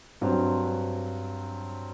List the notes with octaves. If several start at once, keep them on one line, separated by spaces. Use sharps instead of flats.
G2 F#3 C4